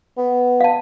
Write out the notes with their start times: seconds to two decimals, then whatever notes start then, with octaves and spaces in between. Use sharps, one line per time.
0.18 B3
0.61 F5 A5